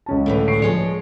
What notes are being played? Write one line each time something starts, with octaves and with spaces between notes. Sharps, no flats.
C#2 C#4 A5
A2 D3 E3
C#6 C7 D7
F3 G#3 C#5